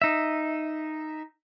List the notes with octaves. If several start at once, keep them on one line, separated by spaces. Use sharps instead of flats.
D#4 E5